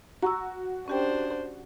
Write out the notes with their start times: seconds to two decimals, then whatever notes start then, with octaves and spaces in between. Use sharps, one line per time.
0.22 F#4 A#5 C#6 E6
0.88 C#4 D4 G4 C5 G5